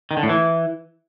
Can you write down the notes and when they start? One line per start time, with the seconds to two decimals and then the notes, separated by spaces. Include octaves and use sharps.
0.11 D#3
0.17 D3
0.23 A2
0.29 E3